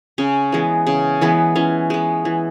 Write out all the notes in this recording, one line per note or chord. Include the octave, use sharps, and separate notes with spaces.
C#3 C#4
E3 G#3 B3
C#3
E3 G#3 B3
E3 C#4
G#3 B3
E3